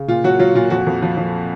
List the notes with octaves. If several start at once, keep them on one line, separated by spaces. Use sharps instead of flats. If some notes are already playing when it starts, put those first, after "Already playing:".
Already playing: C#3
A#2 F4
F#3 F#4
F#3 F4
A#2 F4
F2 F#4
F2
F3
F3